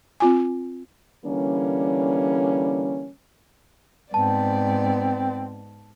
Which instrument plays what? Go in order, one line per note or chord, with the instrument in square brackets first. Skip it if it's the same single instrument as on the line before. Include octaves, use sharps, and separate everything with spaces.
[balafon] C4 F4 G#5
[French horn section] D3 E3 G3 A#3 C#4
[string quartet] G#2 B3 D5 [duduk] C4 [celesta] A5